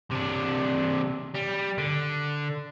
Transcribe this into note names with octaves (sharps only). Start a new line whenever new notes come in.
C3 D4
G3
D3